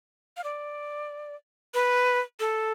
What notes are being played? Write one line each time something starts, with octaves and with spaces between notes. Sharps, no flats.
F5
D5
B4
A4